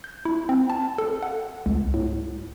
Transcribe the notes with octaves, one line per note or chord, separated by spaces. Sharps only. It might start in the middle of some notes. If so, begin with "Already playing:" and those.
G6
E4
C4
A5
A4
F#5
C#2
A2